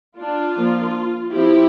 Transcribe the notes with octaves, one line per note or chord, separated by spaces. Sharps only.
D4 F4
F3 A#3 D4
F3 C4 E4 G4